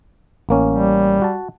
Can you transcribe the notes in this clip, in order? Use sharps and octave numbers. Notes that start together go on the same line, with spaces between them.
A1 A#3 C#4
G3
F#4 A5